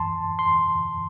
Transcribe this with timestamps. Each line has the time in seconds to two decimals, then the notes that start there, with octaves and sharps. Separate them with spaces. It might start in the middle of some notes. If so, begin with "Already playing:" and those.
Already playing: F#2 E3 A5 C6
0.39 C6